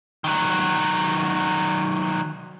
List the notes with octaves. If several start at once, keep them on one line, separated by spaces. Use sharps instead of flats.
D#3 F#3